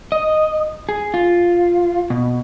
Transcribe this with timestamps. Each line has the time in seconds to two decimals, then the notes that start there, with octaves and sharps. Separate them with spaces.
0.12 D#5
0.89 G#4
1.14 F4
2.10 B2